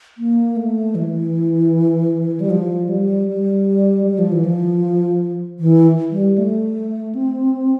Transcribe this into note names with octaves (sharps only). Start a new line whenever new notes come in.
A#3
A3
E3
G3
F3
G3
G3
G3
F3
E3
F3
E3
G3
A3
C4